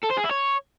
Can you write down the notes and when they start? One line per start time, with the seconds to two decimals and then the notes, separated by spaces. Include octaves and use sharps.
0.04 A4
0.11 C5
0.17 G#4
0.24 E4
0.31 C#5